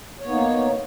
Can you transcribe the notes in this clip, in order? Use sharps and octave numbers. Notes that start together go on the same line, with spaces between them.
A#3 B3 D#4 C#5